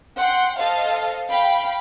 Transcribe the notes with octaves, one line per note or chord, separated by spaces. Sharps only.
F#5 G5 C6
A4 C5 D#5 F5
F5 G5 B5